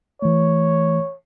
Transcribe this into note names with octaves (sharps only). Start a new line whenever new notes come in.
E3 A3 C#5